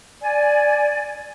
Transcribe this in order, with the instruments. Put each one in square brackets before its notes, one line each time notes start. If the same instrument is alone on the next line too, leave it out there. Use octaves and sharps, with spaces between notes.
[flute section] D5 G#5